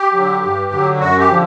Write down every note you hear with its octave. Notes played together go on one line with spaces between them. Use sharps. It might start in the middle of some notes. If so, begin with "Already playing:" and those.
Already playing: G4
D3 F#3
G2
D3 F#3
F#2 F#4
G4
D3 F3